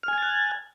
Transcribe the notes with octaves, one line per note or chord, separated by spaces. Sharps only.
G#5 F6 F#6 G#6 A6